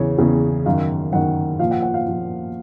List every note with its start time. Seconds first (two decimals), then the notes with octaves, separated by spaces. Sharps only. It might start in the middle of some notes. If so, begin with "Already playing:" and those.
Already playing: E2 C#3 E3 C#5
0.18 E2 C#3 E3
0.66 F#2 D#3 F5
1.12 F#2 D#3 F#5
1.59 A#2 F3 F5
1.71 F#5
1.83 F#5
1.94 F5
2.07 A#2 F3